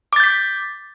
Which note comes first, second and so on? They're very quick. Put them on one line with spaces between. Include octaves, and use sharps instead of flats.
D6 A6 G6 B6